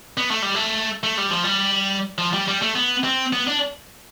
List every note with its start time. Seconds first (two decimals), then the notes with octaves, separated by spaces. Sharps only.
0.17 B3
0.31 A3
0.42 G3
0.55 A3
1.03 A3
1.18 G3
1.30 F3
1.44 G3
2.18 F3
2.33 G3
2.48 G3
2.62 A3
2.75 B3
3.04 C4
3.33 B3
3.47 D4